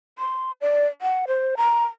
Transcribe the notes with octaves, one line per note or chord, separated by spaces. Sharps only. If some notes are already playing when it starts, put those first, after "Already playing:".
C6
D5
F#5
C5
A#5